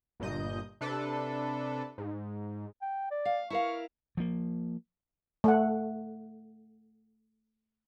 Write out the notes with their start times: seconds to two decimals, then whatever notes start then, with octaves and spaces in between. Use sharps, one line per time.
0.20 G1 G2 A#2 D#5 G6
0.81 C3 D4 A4 B4
1.98 G#2
2.82 G5
3.11 D5
3.25 F5
3.50 E4 A#4 F5 C#6
4.17 F3 A#3
5.44 A3 F#5